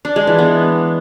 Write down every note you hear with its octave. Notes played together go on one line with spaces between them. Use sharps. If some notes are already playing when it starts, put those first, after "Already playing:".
D4
G#3
E3
B3